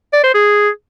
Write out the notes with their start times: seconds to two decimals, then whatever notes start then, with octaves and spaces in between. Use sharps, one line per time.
0.13 D5
0.24 C5
0.34 G#4